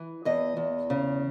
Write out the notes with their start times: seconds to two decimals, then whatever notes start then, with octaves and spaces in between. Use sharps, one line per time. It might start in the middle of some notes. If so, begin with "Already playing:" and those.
Already playing: E3
0.25 E2 D#5
0.57 E2
0.90 C#3